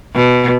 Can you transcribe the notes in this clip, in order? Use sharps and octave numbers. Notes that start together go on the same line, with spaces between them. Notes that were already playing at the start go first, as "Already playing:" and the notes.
B2